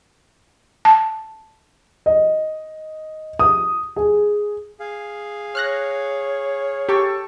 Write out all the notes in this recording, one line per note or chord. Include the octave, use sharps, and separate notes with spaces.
A5
D#5
D#6
G#4
G#4 F5
C#5 F6 F#6 A#6
G4 A4 G5 C#6